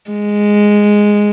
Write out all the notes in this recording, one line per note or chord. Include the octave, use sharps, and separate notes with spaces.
G#3